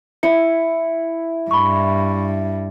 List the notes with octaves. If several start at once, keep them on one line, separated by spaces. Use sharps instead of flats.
E4 C#7
G2 B5 C#6